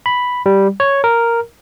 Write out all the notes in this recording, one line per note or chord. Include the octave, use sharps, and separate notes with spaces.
B5
G3
C#5
A#4